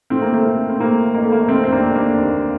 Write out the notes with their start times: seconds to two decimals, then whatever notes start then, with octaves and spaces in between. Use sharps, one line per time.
0.10 A2 C4
0.22 A#3
0.34 A3 C4
0.46 A2
0.70 C4
0.80 A2 A#3
1.14 A1 A#3
1.23 A3
1.32 A#3
1.48 F1 A3 C4
1.64 C4
1.72 A#3 D4
1.83 F1
1.95 A#3 D4
2.17 D#2